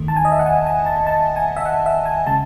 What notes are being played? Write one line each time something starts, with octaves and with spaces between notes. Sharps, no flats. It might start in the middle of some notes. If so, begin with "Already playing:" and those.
Already playing: E2 D#3 A3
A5
G#5
D#5
E5
F#5
G#5
G#5
A5
A5
G#5
E5
F#5
E5
G#5
C#3 G#3 A5